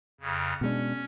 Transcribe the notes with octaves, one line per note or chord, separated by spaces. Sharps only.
F2 C#3
B2 G#3 C#4 D4